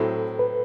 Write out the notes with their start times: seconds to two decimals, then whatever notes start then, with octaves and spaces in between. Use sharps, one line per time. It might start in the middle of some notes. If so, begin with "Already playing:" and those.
Already playing: A2 F#3 C4 E4 A4
0.39 B4